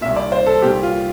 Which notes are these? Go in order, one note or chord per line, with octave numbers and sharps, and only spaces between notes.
C2 A#2 E5
D5
C5
A4
C2 A#2 G4
F4